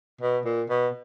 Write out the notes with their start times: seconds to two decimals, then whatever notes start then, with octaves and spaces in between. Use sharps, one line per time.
0.21 B2
0.45 A#2
0.70 B2